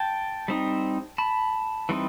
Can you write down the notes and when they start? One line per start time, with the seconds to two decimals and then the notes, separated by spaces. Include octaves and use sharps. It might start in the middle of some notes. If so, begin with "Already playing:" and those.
Already playing: G5 A5
0.48 G3 C4 D#4
1.18 A5 B5
1.89 E3 G3 C4 D#4